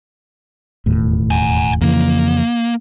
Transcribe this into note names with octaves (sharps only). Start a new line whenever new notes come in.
E1 D#2 A2
F#5 G#5
F2 C#3 E3 A#3